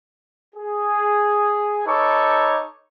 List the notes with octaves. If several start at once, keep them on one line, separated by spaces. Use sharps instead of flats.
G#4
D#4 A4 B4 C#5 C#6 D6